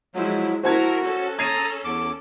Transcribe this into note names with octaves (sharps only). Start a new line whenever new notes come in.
F3 F#3 G#3 E4
E4 F#4 A#4 C5 A5 G#6
C#4 A4
A5 A#5 D#6 G#6 C7 D#7
E2 D6